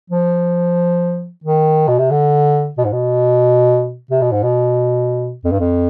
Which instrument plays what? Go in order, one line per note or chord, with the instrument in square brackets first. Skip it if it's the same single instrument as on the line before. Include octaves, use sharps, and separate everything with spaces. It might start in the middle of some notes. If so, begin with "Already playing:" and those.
[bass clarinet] F3
D#3
B2
C3
D3
B2
G#2
B2
C3
B2
G#2
B2
F2
G2
F2